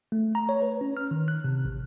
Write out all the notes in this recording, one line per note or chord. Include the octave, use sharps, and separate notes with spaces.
A3
A#5
C#5
B4
C#4
F6
D#3
F#6
C3
A1